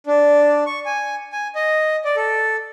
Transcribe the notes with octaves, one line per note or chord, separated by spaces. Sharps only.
D4
C#6
G#5
G#5
D#5
D5
A4